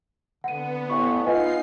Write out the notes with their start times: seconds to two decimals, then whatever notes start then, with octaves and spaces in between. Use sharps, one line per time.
0.44 D3 B3 F#5 D#7
0.90 A1 C#6
1.26 B3 D#4 F4 D#5 G#5 C7